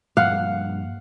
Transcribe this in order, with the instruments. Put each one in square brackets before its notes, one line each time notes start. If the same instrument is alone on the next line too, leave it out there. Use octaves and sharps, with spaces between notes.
[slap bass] G2 F3 A#3 [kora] F5 F#5